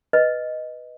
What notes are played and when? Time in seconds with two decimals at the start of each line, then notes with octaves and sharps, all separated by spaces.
0.13 B4 D#5